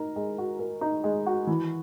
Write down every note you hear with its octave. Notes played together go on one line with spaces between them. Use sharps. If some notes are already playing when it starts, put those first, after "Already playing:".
Already playing: D#4 A#4
G#3
F#4
A#4
D#4
G#3
F#4
E3